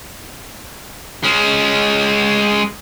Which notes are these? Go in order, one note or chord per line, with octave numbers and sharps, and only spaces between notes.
G#3 C#4